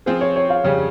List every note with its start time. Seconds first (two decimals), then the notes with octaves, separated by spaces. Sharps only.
0.06 F3 C4 F4 G#4 C5
0.21 C#5
0.36 C#5
0.50 F5
0.64 F2 C#3 G3 C#4